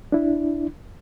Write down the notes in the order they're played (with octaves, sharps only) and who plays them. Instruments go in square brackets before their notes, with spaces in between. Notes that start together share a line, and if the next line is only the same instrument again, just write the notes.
[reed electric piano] D4 E4